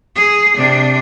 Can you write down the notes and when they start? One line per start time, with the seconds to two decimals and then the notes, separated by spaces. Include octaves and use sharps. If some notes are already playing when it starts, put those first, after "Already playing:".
0.16 G#4
0.57 C3 D4